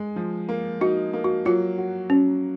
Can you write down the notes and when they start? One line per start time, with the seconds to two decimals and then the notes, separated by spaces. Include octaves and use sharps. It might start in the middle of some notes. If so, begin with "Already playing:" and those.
Already playing: G#3
0.16 F3
0.49 A#3
0.81 D#4 F#4
1.13 A#3
1.24 F#4
1.45 F#3 F4
1.78 F#4
2.10 F#3 C#4